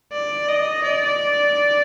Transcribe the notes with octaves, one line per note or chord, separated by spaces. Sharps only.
D5
D#5
D5